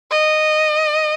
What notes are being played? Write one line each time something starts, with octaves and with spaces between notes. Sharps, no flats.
D#5